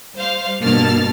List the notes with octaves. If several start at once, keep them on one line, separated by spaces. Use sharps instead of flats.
G3 C5 F5
G2 B2 A#3 A5 F6 A6